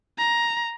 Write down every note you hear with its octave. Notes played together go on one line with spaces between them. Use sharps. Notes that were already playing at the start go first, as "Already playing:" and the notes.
A#5